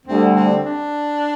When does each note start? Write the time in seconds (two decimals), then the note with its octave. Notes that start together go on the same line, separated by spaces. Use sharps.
0.06 D2 D3 G3 C4
0.35 C4
0.65 D4